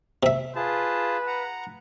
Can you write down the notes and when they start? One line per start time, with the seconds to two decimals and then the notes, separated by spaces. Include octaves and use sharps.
0.23 C3 E5
0.56 F4 G#4 B4 A5
1.27 F#5 A#5